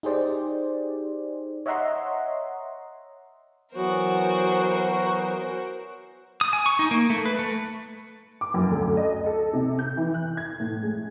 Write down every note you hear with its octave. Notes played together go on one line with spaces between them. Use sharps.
D#4 G4 G#4 C5 D5
C#5 D#5 E5 F#5 A#5 C6
E3 F#3 B3 F#4 A#4 C5
D#6
G#5
C#6
D#4
A#3
A3
B4
A3
D6
F#2
D2
D#5
A4
C3
G6
E3
F#6
G#6
A2
G#3